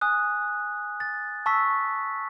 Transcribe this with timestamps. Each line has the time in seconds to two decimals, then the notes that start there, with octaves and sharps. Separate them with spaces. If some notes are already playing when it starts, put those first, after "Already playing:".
0.01 G#5 D#6 F#6
1.00 A6
1.46 A5 C#6 E6 B6